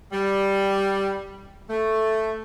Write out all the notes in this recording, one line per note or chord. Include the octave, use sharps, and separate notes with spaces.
G3
A3